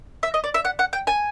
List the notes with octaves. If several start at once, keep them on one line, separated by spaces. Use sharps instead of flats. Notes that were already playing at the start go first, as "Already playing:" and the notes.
E5
D#5
D5
E5
F#5
F#5
G5
G#5